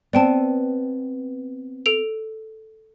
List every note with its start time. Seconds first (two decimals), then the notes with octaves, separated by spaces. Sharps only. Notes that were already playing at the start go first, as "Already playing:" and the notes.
0.13 B3 C4 D5 G5 A5
1.86 A4 D7 F7